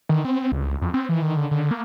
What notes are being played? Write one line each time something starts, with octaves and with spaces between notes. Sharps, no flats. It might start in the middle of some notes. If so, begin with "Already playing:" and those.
D#3
C4
C#2
F2
C4
E3
D#3
D3
D3
A#3